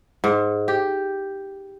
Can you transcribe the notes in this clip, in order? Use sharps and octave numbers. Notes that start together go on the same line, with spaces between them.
G#2
G4